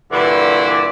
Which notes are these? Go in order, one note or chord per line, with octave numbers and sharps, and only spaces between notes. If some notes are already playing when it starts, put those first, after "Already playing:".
G2 A#2 D3 E3 E4 D5